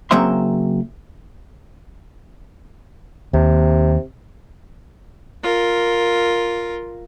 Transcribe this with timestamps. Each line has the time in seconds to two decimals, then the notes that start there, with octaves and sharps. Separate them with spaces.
0.11 C#3 F#3 A#3 C4 E5 C6
3.33 D#2 C3
5.43 F4 A#4